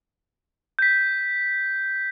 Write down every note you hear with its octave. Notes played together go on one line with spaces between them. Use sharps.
G6 B6